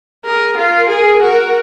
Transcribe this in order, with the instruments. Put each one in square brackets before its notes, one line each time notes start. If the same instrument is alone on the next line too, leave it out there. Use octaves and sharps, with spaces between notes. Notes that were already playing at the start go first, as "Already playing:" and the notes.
[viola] G#4 [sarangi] A#4
[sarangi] F4 [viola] A#4
[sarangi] G#4
[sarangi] F#4 [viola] A#4